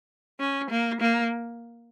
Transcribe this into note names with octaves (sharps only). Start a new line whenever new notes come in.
C#4
A#3
A#3